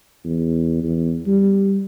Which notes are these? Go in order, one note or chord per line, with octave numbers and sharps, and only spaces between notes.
E2
E2
G3